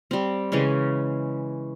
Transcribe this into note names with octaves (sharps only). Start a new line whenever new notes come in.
G3 C4
C#3 E3 G#3 C#4